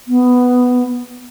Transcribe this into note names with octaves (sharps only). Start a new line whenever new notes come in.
B3